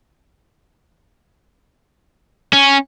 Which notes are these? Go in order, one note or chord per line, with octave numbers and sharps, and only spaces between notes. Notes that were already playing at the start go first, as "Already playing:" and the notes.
C#4